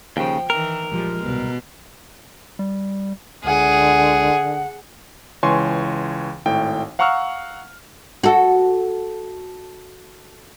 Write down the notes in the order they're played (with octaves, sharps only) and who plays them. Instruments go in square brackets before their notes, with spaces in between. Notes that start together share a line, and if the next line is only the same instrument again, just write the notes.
[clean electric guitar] D#2 C#3 [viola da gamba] F3 [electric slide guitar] G5
[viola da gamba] D#3 E3 [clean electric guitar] A#4
[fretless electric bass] A#1 F3 [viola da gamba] G3 G#3
[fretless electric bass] D1 C2 [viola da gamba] B2
[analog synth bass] G3
[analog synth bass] C#2 [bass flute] D3 [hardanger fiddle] G#4 [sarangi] F#5
[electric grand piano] C#2 E3 C#5 G#5 C6 C#6
G#1 A2 G5
F5 F#5 A#5 C#6 E6 F6
[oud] F#4 A4